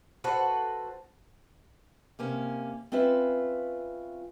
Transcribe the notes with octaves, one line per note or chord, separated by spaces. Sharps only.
F#4 A4 B4 C5
C3 A#3 C#4
C4 C#4 F4 B4 E5